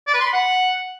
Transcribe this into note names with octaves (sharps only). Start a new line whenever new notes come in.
D5
B4
C6
B5
F#5